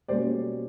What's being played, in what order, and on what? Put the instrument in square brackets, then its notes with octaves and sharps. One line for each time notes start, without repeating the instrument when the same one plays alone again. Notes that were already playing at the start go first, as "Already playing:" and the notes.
[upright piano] B2 G3 A#3 C#4 C5 D5